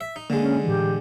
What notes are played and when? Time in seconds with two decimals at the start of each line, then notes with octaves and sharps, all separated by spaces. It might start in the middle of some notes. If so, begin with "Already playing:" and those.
0.01 E5
0.16 D#4
0.30 D3 G#3 A#3
0.42 C#4
0.64 A2 E3 G4